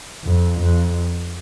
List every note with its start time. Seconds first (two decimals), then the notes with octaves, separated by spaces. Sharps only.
0.24 F2
0.61 F2